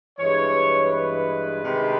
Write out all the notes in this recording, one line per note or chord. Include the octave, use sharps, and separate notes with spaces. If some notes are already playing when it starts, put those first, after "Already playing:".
G2 E3 G#3 C#5
B4
C3 D#3 G#3